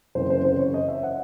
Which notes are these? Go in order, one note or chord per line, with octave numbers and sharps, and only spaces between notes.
F#1 F#2 C#3 E3 C4 C5
C5
C5
C#5
D#5
E5
F#5